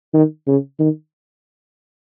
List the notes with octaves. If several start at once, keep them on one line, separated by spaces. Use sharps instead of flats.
D#3
C#3
D#3